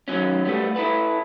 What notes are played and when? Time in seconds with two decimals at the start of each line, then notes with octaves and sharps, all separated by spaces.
0.08 D#3 F#3 C#4
0.45 G3 A3 B3
0.76 E4 A4 B4